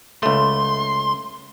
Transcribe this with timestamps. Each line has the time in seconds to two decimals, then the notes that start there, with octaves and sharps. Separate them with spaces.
0.23 C#2 A3 C6